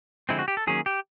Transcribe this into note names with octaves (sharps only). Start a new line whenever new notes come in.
D3 F3 G#3 C4 E4
F#4
G4
A4
D#3 F#3 A#3 C#4 G#4
G4